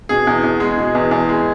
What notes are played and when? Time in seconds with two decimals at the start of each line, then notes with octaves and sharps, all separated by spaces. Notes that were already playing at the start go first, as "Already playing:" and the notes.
0.09 B2 G#4
0.27 E2
0.44 E2
0.60 G#3
0.78 B2
0.95 E2
1.11 E2
1.29 G#3